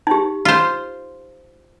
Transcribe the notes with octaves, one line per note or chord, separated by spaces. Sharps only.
D#4 G4
F4 C5